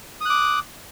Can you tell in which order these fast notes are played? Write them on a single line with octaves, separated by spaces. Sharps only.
D#6 F#6 D6